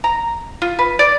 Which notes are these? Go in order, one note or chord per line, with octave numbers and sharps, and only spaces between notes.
A#5
F4
B4
D5